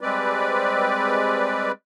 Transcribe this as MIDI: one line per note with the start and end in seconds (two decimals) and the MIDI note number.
0.01 1.72 55
0.01 1.72 56
0.01 1.72 60
0.01 1.72 71
0.01 1.72 74